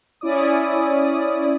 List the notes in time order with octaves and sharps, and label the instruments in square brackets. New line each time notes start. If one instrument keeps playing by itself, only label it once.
[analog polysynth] C#4 E4 D5 D#6